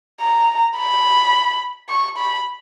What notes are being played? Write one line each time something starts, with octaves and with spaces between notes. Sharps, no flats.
A#5
B5
C#6
B5